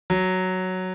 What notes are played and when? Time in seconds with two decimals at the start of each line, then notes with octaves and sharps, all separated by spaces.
0.10 F#3